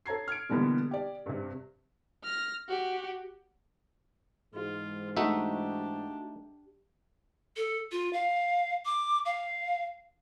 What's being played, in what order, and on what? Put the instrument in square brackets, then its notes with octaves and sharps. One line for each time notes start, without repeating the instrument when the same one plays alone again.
[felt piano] A4 C#5 A#5 G#6 C7
F6 G#6 C#7 D7
B2 D3 E3 G3 A#3 B3
G4 D5
G2 C3
[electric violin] F6 A#6
F#4 G4
[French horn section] G#2 E3 G#3 [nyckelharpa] F4
[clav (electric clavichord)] A3 D#4 E5 [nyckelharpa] D4 G4 [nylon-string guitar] F#4
[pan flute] A4
F4
F5
D6
F5